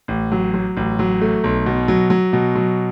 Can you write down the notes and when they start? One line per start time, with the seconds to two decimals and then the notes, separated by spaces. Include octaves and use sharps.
0.08 A1
0.32 F#3
0.54 F#3
0.77 A1
0.99 F#3
1.22 A3
1.44 B1
1.66 B2
1.88 F#3
2.10 F#3
2.33 B2
2.55 F#3